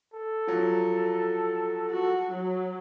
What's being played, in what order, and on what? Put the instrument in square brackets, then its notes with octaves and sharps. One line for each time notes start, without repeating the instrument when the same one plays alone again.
[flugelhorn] A4
[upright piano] F3 F#3
[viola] F#4
F#3